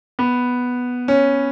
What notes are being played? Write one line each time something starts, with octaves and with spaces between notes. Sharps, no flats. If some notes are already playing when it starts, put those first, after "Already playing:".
B3
C#4